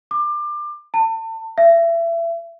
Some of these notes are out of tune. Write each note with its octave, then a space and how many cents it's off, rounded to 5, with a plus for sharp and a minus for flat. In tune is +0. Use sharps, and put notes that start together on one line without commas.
D6 +25
A5 +35
E5 +30